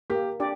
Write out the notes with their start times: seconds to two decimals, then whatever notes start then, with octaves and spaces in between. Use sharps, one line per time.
0.10 A#3 G4
0.40 D4 G4 D5